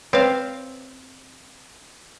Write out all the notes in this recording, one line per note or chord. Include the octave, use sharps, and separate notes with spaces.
C4 B4 C#5 F5